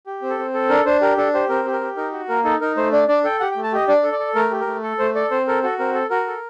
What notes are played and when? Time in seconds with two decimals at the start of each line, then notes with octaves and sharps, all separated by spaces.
0.06 G4
0.22 C4
0.30 A4
0.39 C4
0.54 A4
0.69 D4 A#4
0.85 D4 C5
1.01 G4 A#4
1.17 D4 A4
1.34 G4 C5
1.49 C4 A#4
1.66 G4
1.73 A#4
1.81 G4
1.97 D#4 A#4
2.12 F#4
2.29 A#3 A#4
2.44 D#4 A4
2.61 D#4 A#4
2.77 A3 C5
2.92 D4 D5
3.08 D4 D5
3.24 A4 G5
3.40 G4 F#5
3.52 G5
3.56 A3
3.64 A5
3.72 G4 D#5
3.88 D4 D5
4.03 A4
4.12 D5
4.19 A4
4.35 A3 A#4
4.51 G4
4.60 A#4
4.67 A3
4.83 A4
4.99 A3 C5
5.15 A4 D5
5.31 C4 C5
5.48 A4 A#4
5.63 F#4 A4
5.79 C4 A#4
5.95 A4
6.10 F#4 A#4
6.27 A4